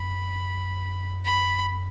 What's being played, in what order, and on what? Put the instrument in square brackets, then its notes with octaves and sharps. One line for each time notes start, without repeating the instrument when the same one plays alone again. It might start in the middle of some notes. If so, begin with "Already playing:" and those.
Already playing: [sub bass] F#2 [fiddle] B5
[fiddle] B5